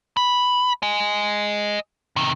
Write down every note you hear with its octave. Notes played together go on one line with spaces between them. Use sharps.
B5
D#5 G#5
C3 D#3